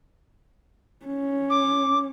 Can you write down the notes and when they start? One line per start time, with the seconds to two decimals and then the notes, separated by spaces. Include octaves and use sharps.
1.06 C#4
1.50 D6